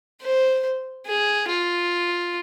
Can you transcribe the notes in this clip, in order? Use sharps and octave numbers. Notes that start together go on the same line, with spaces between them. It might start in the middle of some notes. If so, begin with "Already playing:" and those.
C5
G#4
F4